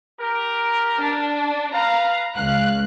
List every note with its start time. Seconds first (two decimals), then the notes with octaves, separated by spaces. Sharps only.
0.20 G4 A#4
0.99 D4
1.73 B4 F5 A#5
2.36 C#2 F5 F#6